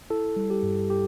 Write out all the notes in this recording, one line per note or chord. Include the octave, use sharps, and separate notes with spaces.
E4 A4
G3
G4
G2
G4